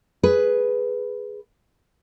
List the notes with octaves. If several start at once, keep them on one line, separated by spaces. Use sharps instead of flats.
G#4 B4